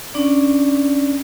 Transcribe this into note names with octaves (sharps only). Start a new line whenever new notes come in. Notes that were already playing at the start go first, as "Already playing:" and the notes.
C#4 D4 D5